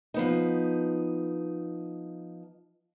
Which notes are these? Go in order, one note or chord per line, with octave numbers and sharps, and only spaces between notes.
F3 B3 D#4